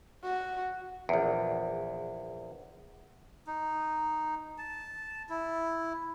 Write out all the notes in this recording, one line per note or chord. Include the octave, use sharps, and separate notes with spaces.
F#4
A#1 E2
D#4
A5
E4